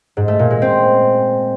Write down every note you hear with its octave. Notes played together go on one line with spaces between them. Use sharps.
G#2
A3
A#2
G#3
C4